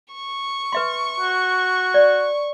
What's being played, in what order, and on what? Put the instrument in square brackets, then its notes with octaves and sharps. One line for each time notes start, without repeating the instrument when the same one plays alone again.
[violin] C#6
[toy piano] B4 E5 C6
[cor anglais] F#4
[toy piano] D5